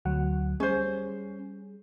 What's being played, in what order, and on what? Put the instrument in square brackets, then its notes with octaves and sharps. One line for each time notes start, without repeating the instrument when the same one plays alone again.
[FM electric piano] D2 F#3 F#5
[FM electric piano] G3 G#4 [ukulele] C#4 C5